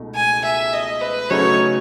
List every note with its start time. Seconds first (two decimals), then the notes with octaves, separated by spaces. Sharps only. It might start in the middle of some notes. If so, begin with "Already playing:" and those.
Already playing: C#2 B2 A3 D#4
0.15 G#5
0.45 E5
0.73 D#5
1.01 B4
1.30 C#3 F#3 A3 D#4 C#5